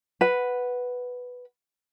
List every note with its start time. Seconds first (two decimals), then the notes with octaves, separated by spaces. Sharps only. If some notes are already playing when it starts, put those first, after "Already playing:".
0.21 B4 F#5